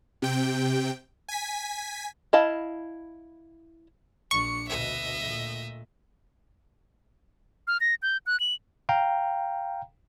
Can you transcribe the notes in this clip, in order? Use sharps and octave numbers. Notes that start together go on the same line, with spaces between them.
C3 G5
G#5 B6
E4 D#5 F5 A5 B5
A#1 D4 C#6 C#7
D2 B2 D#5 E5
A#2 A3
F6
A#6
G6
F#6
F#7
F5 G5 A#5